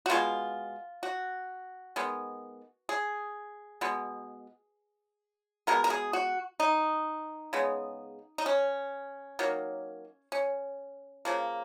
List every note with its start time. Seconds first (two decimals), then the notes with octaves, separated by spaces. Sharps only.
0.06 F#4
0.10 B2 G#3 B3 F4
1.03 F#4
1.96 D#3 G#3 B3
2.89 G#4
3.81 B2 G#3 B3
5.67 B2 G#3 B3 A#4
5.84 A#4
5.90 G#4
6.13 F#4
6.60 D#4
7.53 C#3 G#3 B3
8.38 D#4
8.46 C#4
9.39 D#3 F#3 A#3
10.32 C#4
11.25 C#3 F3 A#3